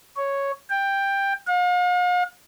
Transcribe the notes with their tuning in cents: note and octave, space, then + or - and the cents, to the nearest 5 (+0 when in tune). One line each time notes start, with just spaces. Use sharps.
C#5 +0
G5 +10
F5 +45